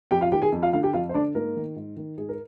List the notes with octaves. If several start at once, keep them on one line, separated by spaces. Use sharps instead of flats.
F2 G4 G5
F4 F5
D#3 G4 G5
G#4 G#5
F2
F4 F5
D3 F4 F5
G4 G5
F2 F4 F5
C5
D3 D4 D5
G#2 A#3 A#4
D#3
G#2
D#3
G#2 G#4
A#4